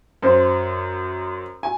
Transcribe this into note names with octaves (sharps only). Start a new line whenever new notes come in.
F#2 C5
G#5